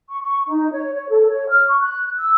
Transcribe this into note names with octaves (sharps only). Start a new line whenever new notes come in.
C#6
C#6
D#4
C#5
C#5
A4
C#5
F6
C#6
F#6
E6